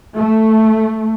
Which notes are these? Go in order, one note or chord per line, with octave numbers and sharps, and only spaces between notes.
A3